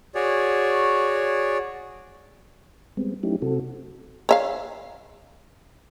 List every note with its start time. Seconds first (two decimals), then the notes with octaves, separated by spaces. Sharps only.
0.15 F#4 G#4 C#5 D5
2.97 G3 G#3 B3 C4
3.23 F#3 A3 C#4 D#4 E4 G4
3.42 C3 C4 F#4 A4
4.29 C#5 E5 F5